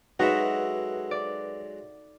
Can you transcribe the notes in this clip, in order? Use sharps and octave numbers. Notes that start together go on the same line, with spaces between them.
F#3 G#3 D#4 F#4 A4 B4 E5 F#5
D5